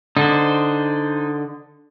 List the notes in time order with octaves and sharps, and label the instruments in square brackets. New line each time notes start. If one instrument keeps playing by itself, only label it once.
[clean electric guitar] D3 [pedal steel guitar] D#4 C5